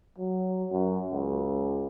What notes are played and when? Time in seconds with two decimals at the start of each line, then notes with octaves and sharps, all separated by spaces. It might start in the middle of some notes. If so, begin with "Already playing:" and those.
0.18 F#3
0.72 F#2
1.12 C#2